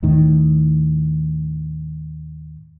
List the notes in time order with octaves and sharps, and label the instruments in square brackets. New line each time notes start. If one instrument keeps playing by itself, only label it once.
[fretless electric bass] D#2 A2 D#3